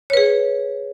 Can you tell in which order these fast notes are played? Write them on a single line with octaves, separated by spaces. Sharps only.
C#5 B4 G#4